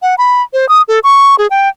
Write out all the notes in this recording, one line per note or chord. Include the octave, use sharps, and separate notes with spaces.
F#5
B5
C5
D#6
A4
C#6
G#4
G5